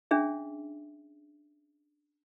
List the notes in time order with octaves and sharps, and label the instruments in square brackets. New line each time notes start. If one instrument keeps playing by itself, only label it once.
[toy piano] C#4 D4 G#4 E5